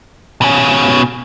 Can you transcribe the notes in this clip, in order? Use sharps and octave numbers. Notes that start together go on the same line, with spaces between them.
B2 C#4